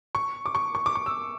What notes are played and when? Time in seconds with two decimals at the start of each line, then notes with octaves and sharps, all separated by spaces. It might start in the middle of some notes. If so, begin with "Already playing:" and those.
0.15 C#6
0.46 D6
0.55 C#6
0.75 C#6
0.86 D6
0.95 C#6
1.06 E6